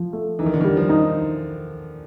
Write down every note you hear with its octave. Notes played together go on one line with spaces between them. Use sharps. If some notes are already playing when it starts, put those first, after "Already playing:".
Already playing: F3
A3
E3 D#4
D#3
D3
D#3
G3
F3
D#4